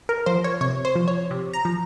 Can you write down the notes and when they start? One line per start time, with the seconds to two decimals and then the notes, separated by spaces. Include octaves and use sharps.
0.09 A#4
0.26 F3 C5
0.44 C#5
0.61 C3 C#5
0.85 C5
0.96 F3
1.08 C#5
1.31 C3
1.53 A#5
1.65 F3